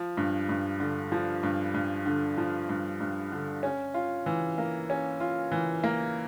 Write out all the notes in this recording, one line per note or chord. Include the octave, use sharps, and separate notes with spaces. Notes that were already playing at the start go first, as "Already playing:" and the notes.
Already playing: F3
G2
G2
D3
F3
G2
G2
D3
F3
G2
G2
D3
C#4
F4
E3
A#3
C#4
F4
E3
A#3